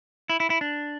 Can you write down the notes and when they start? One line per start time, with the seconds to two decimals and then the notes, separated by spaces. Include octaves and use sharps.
0.30 E4
0.40 E4
0.50 E4
0.61 D4